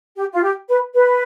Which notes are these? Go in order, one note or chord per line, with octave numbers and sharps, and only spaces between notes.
G4
F4
G4
B4
B4